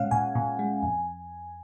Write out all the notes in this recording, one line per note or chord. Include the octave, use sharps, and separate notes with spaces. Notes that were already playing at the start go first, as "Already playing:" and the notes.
Already playing: A#2 G#3 C#4 F5 F#5
A#2 G#5
A#2
G#3
F2